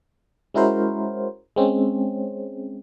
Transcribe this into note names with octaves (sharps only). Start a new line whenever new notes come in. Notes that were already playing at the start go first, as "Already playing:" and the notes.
G#3 C#4 E4 F#4 A#4 C5
G#3 C4 C#4